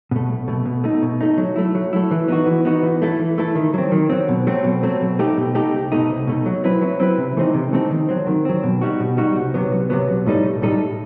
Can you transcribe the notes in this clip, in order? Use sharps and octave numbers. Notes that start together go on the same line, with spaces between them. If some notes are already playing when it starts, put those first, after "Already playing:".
B2 A3
B1
B2 A3
B2
A3 D#4
B2
A3 D#4
F#3
A3 E4
F#3
A3 E4
E3
B3 D#4 F#4
E3
B3 D#4 F#4
E3
A3 E4 A4
E3
A3 E4 A4
D#3
F#3 C4
D#3
F#3 C4
B2
F#3 A3 C4
B2
F#3 A3 C4
B2
A3 D#4 G4
B2
A3 D#4 G4
C2
B2 A3 D#4
C2
B2 A3 D#4
F#3
C4 E4 B4
F#3
C4 E4 B4
C3
E3 A3 C4 D#4
C3
E3 A3 C4 D#4
D#3
F#3 C4
D#3
F#3 C4
B2
G3 D#4 F#4
B2
G3 D#4 F#4
C2
C3 F#3 B3
C2
C3 F#3 B3
B1
A2 G3 D#4 A4
B1
A2 G3 D#4 A4